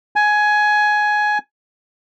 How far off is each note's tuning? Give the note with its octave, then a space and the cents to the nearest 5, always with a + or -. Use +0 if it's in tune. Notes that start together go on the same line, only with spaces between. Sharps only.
G#5 +15